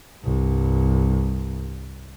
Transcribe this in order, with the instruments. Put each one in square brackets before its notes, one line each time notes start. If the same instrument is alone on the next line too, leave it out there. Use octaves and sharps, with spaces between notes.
[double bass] C2 G2